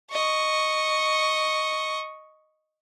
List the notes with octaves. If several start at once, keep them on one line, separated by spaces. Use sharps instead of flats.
D#5 C#6